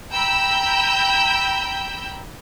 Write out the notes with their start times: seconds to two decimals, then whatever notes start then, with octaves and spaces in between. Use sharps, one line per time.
0.11 G5 A#5 B5 E6 G6